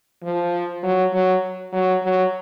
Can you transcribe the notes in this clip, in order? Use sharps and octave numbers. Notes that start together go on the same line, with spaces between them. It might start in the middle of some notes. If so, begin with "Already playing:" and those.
F3
F#3
F#3
F#3
F#3